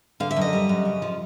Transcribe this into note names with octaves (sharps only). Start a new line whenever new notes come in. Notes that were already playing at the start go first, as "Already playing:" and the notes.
D3 F5
E5
F#2 D#5
G3
F#2
C#3
F3